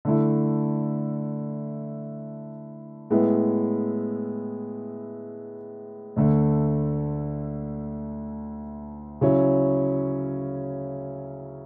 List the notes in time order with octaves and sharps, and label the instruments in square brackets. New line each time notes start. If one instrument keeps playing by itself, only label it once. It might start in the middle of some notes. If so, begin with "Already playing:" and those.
[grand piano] D3 A3 E4
A2 G#3 B3 E4
D2 D3 A3
C#3 F#3 C#4 E4